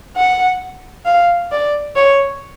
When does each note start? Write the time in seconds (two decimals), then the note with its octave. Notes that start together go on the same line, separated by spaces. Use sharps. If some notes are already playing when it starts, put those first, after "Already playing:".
0.16 F#5
1.06 F5
1.51 D5
1.96 C#5